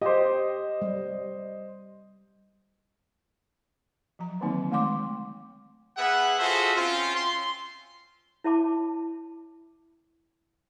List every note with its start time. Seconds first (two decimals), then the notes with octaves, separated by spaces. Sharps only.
0.02 G4 C5 D#5
0.82 G3
4.19 F3 F#3 A#5
4.41 D3 D#3 F#3 A#3 C4 D#4
4.71 D#3 G#3 A3 G5 C6 D6
5.97 B3 G#4 B4 E5 F#5
6.39 F4 F#4 G#4 A4 C5 E5
6.77 C4 C#4 F4
7.16 C6
8.44 E4 C#5 E5 A5 B5 D6